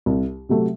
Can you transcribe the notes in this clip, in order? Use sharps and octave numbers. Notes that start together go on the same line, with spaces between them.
C2
C3 F#3 A3